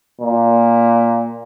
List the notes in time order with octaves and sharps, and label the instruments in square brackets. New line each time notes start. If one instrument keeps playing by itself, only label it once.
[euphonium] A#2